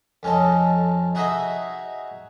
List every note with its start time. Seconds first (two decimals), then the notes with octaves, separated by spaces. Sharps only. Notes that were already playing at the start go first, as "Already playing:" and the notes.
0.23 F2 C#4 A4 D#5
1.15 D#4 F#4 G#4 D#5 E5